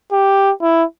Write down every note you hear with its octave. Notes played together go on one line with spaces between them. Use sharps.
G4
E4